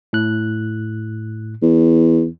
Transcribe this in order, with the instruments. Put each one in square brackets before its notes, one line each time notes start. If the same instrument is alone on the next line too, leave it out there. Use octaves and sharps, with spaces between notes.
[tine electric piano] A2 F#6
[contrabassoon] E2